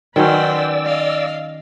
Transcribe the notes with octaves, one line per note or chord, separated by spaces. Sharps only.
D#3 F#3 C#4 B4 C5 D5 E6
D#5 F5